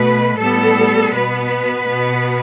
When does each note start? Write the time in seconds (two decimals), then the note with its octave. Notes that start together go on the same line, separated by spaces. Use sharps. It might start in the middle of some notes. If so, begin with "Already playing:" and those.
Already playing: B2 A3 B4
0.37 A2 G3 B3 A4
1.12 B2 B3 B4
1.87 B2 B3